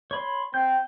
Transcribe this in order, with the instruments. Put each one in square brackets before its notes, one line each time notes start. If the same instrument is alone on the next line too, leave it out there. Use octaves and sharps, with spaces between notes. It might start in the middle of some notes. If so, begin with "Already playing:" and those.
[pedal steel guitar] C#5 B5 C6
[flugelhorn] C4 [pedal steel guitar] G6